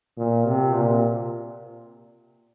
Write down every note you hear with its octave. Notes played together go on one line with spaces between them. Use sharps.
A#2
C3
A#2